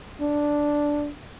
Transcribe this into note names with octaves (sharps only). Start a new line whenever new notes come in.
D4